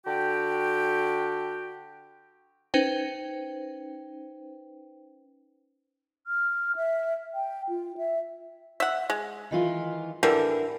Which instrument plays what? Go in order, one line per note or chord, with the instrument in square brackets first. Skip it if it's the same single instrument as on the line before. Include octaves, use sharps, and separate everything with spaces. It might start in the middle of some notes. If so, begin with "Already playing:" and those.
[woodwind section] D3 F#4 G4 G5
[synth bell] C#4 D#4 B4 C5 G5
[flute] F6
E5
G5
F4
E5
[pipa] E5 F#5
G#3
[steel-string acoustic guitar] D#3 E3 F4
[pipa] D3 E3 G3 [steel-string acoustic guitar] A#4